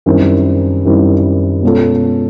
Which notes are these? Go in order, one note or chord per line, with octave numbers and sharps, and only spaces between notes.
F#2 D#3 G3 C4 E4
F#2 D#3 G3 C4 E4
B2 G#3 C#4 F4 A4